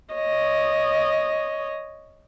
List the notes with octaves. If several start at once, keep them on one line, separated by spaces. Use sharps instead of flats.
C#5 D#5